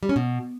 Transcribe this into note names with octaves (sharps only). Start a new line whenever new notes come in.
G3
C#4
B2